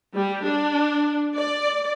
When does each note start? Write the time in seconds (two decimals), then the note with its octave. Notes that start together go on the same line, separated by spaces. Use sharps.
0.15 G3
0.46 D4
1.35 D5